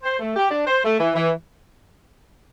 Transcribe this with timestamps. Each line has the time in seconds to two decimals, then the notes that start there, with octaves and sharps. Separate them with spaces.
0.03 C5
0.20 A3
0.36 G4
0.51 D4
0.67 C5
0.84 A3
1.00 E3
1.15 E3